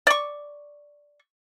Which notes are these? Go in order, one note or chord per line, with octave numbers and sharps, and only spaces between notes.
D5 C#6